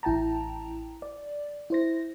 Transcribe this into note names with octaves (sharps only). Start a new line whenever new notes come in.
A1 E4 G5 A5 A#5
D5
E4 C5 A#6